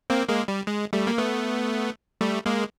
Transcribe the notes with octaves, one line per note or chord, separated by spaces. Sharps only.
A#3 C4
G#3 A#3
G3
G#3
G3 A3
A#3
A3 B3
G3 A3
G#3 A#3